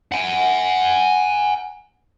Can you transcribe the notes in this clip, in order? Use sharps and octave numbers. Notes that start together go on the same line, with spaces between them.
F#5 G#5